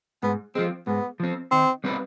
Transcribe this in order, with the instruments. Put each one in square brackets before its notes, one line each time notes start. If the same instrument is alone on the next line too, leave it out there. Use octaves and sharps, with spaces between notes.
[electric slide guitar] G#2 [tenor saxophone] B3
[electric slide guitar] F3 C4 [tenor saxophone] G#3
[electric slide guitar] G#2 [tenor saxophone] B3
[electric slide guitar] F3 C4
[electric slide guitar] D#3 [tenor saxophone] C4
[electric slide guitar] G3 C4 D#4 B4